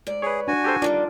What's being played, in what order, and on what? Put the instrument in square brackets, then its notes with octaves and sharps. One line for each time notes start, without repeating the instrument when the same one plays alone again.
[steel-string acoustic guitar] G#2 D5
[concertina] G#4 [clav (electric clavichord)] B4 C#5
[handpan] D4 [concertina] F#4 G#5
[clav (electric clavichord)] G4 A4 C5
[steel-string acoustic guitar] D3 D#3 G3 [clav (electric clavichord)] D4 [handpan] F4 A#4 D5